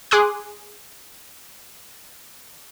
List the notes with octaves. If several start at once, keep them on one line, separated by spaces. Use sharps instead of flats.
G#4 C6 D6 D#6 F#6